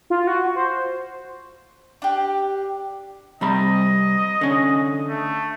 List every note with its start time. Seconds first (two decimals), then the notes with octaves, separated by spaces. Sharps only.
0.10 F4
0.27 F#4
0.56 C5
2.02 D4 G4
3.41 C3 G3 D#5 B5
4.41 D3 C#4
5.09 A3